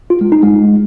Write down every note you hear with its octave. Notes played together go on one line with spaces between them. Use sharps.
F4
G#3
D#4
G#3